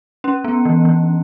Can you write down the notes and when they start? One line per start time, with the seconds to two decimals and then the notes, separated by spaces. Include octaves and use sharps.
0.24 C#4
0.44 B3
0.65 E3
0.85 E3